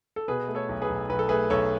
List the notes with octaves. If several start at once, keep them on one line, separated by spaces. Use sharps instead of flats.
A4
B2 G#4 B4
A3
A4 C#5
B1
G#4 B4
B1
B1 B4
A4
A3 G#4 B4
B1 A4 C#5